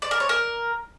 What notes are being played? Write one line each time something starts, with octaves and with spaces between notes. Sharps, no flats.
D5
A#4
C#5
A#4